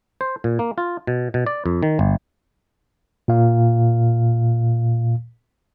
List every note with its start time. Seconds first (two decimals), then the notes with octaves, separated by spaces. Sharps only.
0.21 C5
0.44 A#2
0.59 A#3
0.78 F4
1.07 B2
1.34 B2
1.46 D5
1.66 F2
1.83 D#3
1.99 G1
3.28 A#2 F5